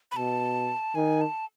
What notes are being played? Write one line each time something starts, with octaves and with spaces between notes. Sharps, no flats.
B5
B2 A5
D#3 G#5
A5